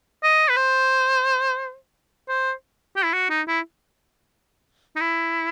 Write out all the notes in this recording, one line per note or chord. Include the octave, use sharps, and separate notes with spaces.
D#5
B4
C5
C5
G4
E4
F#4
D#4
E4
D#4
E4